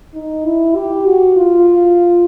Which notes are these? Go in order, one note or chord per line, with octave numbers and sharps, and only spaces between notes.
D#4
E4
G4
F#4
F4